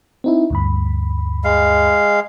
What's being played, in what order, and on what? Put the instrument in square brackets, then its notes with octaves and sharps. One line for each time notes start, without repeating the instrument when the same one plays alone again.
[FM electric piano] C4 D#4 E4
D2 G2 B5
[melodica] G#3 F5